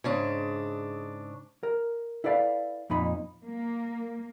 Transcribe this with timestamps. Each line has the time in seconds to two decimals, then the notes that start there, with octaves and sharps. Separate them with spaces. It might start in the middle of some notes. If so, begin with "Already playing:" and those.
0.04 G#2 C#3 D4
1.63 A#4
2.24 E4 A4 B4 D5 F5
2.90 F2 A#2 D#4 B5
3.43 A#3